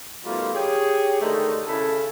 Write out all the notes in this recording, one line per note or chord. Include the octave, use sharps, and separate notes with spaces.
B2 D#3 G3 A3 A#3 F4
G4 G#4 C#5
D3 D#3 G#3 A3 D#4
C#3 C#4 E4 A4